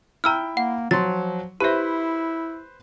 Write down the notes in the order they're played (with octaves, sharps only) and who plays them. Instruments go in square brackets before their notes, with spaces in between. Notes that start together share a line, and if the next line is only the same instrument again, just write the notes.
[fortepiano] E4 G5 [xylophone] A#5 E6 F6
[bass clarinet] A#3 [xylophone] F#5
[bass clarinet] F3 [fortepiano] F#3 C6 [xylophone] A6
[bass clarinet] E4 [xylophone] G4 E5 [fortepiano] B4 C5